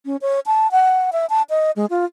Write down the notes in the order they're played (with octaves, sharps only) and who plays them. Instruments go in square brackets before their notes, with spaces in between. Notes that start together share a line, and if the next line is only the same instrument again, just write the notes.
[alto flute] C#4
C#5
A5
F#5
E5
A5
D#5
G#3
F4